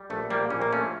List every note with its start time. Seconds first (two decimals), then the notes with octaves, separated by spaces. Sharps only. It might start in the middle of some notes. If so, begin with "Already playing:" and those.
Already playing: G3
0.10 A#1 A3
0.30 A#1 G3 A#3
0.50 A#1 C#4
0.62 A#3
0.71 F3 A3 C#4